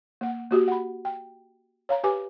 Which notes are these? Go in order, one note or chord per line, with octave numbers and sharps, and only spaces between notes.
A#3 F#5
A#3 F#4 G4
F#5 B5
G5
C#5 F5 A#5
G4 B4 G#5 D6